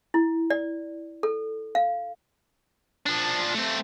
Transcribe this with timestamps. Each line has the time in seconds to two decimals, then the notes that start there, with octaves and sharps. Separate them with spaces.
0.14 E4
0.50 D5
1.23 A4
1.75 F5
3.06 F3 D4
3.54 A3 C4